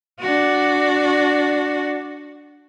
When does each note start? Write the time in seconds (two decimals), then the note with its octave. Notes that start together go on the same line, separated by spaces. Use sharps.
0.20 D4 F#4